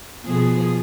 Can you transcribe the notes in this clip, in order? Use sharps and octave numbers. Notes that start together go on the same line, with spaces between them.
B2 F3 G#4